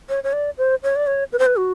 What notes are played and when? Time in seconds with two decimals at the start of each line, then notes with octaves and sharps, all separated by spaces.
0.09 C#5
0.24 C#5
0.33 D5
0.58 C5
0.83 C#5
0.96 D5
1.07 C#5
1.33 B4
1.39 C5
1.46 B4
1.57 F#4